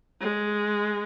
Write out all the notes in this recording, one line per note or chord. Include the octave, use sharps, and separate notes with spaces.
G#3